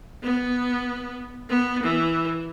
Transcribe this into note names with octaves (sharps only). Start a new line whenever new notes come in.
B3
B3
E3